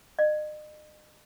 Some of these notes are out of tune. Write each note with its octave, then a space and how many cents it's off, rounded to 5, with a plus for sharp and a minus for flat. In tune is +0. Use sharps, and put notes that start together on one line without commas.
D#5 -40